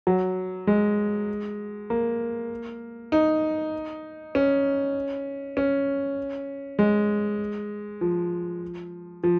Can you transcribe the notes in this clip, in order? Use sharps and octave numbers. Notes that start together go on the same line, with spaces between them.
F#3
G#3
A#3
D#4
C#4
C#4
G#3
F3
F3